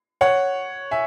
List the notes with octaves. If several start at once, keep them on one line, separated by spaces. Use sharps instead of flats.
C#5 F#5
E5 G#5